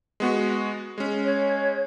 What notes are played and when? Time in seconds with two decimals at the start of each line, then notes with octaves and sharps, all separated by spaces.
0.20 G#3 B3 F#4
0.98 G#3 C#4
1.24 C#5